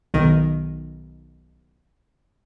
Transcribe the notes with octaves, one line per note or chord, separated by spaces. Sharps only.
B1 D#3